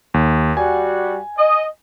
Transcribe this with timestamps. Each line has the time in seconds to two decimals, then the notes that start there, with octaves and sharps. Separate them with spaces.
0.14 D#2
0.57 G3 F#4 G#5
1.38 D#5